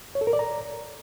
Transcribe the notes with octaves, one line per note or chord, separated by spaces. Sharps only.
C#5
A4
A#4
D5
A#5